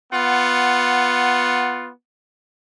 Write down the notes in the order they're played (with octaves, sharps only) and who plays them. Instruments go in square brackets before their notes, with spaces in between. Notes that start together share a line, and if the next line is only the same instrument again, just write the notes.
[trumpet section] B3 F4 F#5